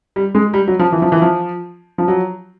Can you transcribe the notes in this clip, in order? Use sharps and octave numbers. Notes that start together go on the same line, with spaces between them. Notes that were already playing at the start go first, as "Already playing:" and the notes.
G3
G#3
G3
F#3
F3
E3
F3
E3
F3
F3
F#3